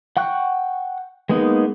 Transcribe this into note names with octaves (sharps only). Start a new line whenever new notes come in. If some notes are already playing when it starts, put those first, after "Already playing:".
F#5 G5 C#6 F#6
G#3 A#3 B3 D#4